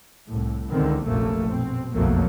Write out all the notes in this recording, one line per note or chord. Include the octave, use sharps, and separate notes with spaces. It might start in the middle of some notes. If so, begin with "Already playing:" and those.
C2 A2
C#2 D3 D#3 C4
F1 A#1 F#2 A#2 A3 A#3
B2 C4
F#1 B1 F2 F#3 A3 A#3